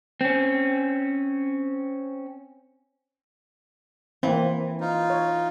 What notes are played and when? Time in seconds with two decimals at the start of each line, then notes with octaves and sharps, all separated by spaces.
0.21 C4 C#4
4.23 E3 A#3 C4
4.81 D#4 F4
5.10 C#5